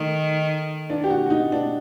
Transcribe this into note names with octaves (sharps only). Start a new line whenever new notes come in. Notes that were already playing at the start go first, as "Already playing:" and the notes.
Already playing: D#3 A3
D4
G4
F#4
F#4
D#4
D4